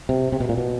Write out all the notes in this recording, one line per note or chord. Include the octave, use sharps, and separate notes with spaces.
C3
C3
B2
A#2
B2